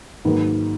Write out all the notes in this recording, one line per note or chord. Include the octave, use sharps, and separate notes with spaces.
G#2 D#3 F#3 A#3 B4